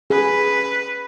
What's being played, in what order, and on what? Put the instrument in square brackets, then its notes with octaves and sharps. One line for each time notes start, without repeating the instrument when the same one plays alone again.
[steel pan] G#4 [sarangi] B4